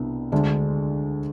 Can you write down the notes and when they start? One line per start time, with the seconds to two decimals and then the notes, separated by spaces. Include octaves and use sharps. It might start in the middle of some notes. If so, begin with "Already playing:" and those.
Already playing: C2 B2 B3 D4
0.32 D2 D3 G#3 D4